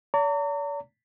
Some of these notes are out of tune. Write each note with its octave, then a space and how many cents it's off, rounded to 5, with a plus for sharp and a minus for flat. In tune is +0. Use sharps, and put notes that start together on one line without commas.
D5 -45 A#5 -40